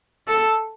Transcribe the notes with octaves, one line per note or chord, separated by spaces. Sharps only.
A4